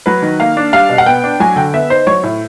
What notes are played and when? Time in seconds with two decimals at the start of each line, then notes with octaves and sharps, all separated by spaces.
0.06 F#3 B4
0.22 D#3
0.40 A#3 F5
0.57 D4
0.73 G3 F5
0.89 B2
0.98 F#5
1.06 B3 G5
1.24 D4
1.40 F#3 G#5
1.56 D3 G5
1.74 B3 E5
1.90 D#4 C5
2.07 F#3 C#5
2.23 A2